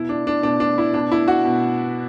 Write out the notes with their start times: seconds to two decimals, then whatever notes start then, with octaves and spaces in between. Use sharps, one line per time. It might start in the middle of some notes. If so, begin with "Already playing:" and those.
Already playing: B2 E4
0.09 D4
0.27 D4
0.43 B2 D4
0.60 D4
0.78 E4
0.94 B2 D4
1.12 E4
1.28 F#4
1.45 B2